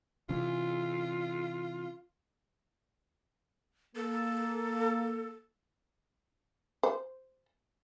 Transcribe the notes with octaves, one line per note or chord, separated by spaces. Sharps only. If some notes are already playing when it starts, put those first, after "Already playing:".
C3 E3 C#4 F4
A#3 A4
C5